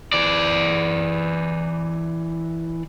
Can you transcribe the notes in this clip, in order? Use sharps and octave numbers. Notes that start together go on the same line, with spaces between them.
E3 D5